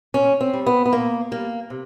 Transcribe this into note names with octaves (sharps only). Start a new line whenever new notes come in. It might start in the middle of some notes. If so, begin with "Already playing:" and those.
A#2 C#4
C4
G3
B3
B3
A#2 A#3
G3 A#3
C3